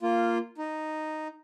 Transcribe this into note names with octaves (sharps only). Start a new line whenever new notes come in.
A#3 F4
D#4